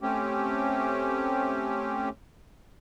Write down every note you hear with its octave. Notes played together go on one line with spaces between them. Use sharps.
A3 C4 C#4 G4